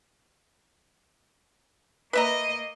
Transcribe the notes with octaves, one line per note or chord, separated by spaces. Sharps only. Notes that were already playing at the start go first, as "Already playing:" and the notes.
A#3 B4 D#5 E5 A#5